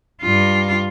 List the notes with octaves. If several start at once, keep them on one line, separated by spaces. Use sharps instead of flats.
G2 F4